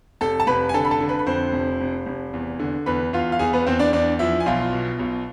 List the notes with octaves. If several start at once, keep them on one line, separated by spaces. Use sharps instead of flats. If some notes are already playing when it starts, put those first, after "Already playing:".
F1 A4 A5
A5
F1 B4 B5
G#5
D3 A4 A5
B5
A4 A5
D3
B4 B5
B5
F2 C5 C6
F1
F1
F1
E2
D3
E2 B4 B5
E2 F4 F5
F5
E2 G#4 G#5
B3 B4
E2 C4 C5
D4 D5
E2 D4 D5
F3 E4 E5
G#5
B1 F4 F5
B2
B1